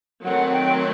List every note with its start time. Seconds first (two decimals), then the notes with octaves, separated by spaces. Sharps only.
0.25 D#3 F#3 A3 C4 F#5
0.52 G5